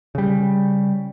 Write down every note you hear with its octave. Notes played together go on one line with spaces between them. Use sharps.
C#3 G3